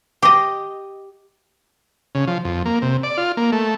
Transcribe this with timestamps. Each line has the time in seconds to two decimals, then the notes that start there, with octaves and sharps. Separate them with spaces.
0.22 G4 D#5
2.15 C#3
2.27 F3
2.45 F2
2.65 A#3
2.82 C3
3.03 D5
3.17 F4
3.37 A#3
3.52 A3